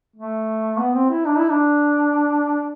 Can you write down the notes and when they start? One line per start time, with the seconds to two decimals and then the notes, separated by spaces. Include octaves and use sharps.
0.16 A3
0.78 B3
0.94 C4
1.10 E4
1.25 D4
1.37 E4
1.50 D4